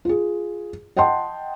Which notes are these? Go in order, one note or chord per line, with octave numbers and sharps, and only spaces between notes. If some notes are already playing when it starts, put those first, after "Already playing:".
F4 G#4
D#5 F#5 G5 A5 C6